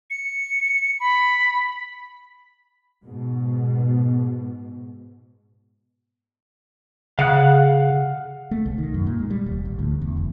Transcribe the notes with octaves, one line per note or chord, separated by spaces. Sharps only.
C#7
B5
G#2 B2
C#3 F5 F#5 F#6
A3
C2
D#3
F#2
A#2
G#3
G3
D#1
A1
D2
E2
F1